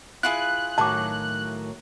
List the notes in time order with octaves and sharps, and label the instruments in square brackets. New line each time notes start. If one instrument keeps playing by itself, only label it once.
[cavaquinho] E4 F4 G#4 [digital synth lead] F#6
[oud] A2 D#3 F#3 [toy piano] A5 D6